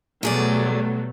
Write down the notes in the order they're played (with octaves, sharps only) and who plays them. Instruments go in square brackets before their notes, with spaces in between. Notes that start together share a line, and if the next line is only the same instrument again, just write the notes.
[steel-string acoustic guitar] E2 G#4 D5 [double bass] B2 B3 [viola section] F#3 G3 A3